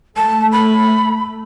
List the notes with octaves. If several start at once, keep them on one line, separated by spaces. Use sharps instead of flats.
A3 A5
B5